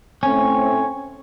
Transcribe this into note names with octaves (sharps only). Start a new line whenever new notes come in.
A2 A3 C4 C#4